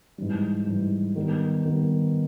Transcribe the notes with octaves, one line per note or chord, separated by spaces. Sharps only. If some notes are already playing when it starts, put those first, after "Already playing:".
G#2 E3 G3
G#2 E3 G3
D#3 G3 B3
D#3 G3 B3